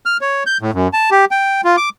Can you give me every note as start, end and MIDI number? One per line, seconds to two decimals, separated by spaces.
0.06 0.17 89
0.21 0.43 73
0.46 0.58 91
0.61 0.71 45
0.74 0.88 42
0.93 1.10 81
1.11 1.25 67
1.31 1.61 79
1.64 1.76 65
1.77 1.89 86